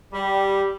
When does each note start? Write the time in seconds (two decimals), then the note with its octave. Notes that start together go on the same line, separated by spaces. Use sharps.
0.13 G3